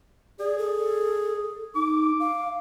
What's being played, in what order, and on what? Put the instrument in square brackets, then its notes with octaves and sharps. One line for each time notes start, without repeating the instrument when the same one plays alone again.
[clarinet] G#4 [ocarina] D5
[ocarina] A4
[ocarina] D#4 [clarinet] D6
[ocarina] F5